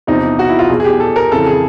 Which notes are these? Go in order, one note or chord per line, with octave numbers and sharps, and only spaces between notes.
E2 C3 F3 D#4
F#4
E4
F4
E2 B2 G#4
G#4
G4
A4
A#4
F2 C#3 E3 A4
G#4